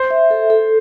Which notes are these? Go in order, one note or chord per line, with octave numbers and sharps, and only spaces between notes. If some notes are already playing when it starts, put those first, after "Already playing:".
Already playing: C5
E5
A4
A4